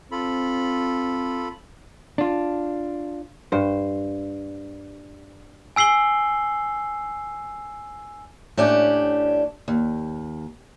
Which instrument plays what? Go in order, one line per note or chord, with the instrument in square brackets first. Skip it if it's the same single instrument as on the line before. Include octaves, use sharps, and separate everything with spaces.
[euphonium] C4 [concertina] F4 A4 B5
[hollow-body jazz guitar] D4 F4
[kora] G2 C5
[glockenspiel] G#5 E6 C7 F#7 G7
[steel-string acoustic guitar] A2 C#4 D4 G4
D#2